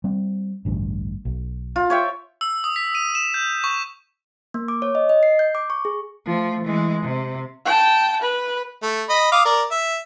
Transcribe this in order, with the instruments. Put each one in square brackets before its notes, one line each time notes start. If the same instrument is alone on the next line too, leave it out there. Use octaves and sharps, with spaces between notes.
[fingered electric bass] G3 C4
A1 D2 G2
B1
[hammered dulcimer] F4
C#5 E5 G5
[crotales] E6
D#6
B6
D#7
E7
G6
C#6
[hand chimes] A#3
D6
C#5
D#5
D#5
C7
G6
D6
C#6
G#4
[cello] F3 A3
E3 G#3
C3
[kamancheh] G5 A5
B4
[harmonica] A3
D#5 B5
F5 D6 D#6
A#4 D5
E5